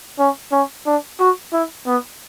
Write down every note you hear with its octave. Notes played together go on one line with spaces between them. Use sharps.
C#4
C#4
D4
F#4
E4
B3